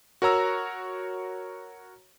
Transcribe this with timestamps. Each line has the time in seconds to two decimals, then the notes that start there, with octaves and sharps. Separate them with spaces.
0.22 F#4 A#4 C#5 A#5 E6